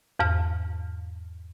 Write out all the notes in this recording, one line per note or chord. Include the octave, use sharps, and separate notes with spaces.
E2 G#2 F6